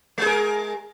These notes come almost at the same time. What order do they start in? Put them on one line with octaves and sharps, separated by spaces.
G#3 G#4 A#4